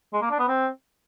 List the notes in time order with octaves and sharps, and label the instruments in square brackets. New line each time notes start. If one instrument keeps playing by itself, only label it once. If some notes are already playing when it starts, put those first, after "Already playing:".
[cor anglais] G#3
A#3
D4
B3
C4